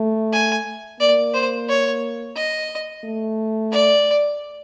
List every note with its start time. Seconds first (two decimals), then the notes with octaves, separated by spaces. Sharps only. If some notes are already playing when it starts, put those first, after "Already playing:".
Already playing: A3
0.33 G#5
1.00 A#3 D5
1.34 C5
1.69 C#5
2.36 D#5
3.04 A3
3.72 D5